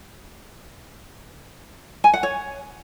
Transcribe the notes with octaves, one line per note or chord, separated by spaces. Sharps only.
G#5
F#5
C#5